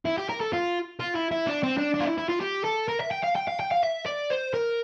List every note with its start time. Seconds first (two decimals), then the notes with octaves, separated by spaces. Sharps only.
0.05 E4
0.18 G4
0.29 A#4
0.41 A4
0.53 F4
1.00 F4
1.15 E4
1.31 E4
1.47 D4
1.63 C4
1.78 D4
1.94 D4
2.00 F4
2.06 E4
2.18 E4
2.29 F4
2.41 G4
2.65 A4
2.89 A#4
3.01 E5
3.12 G5
3.24 F5
3.36 G5
3.48 F5
3.60 G5
3.72 F5
3.83 E5
4.06 D5
4.30 C5
4.54 A#4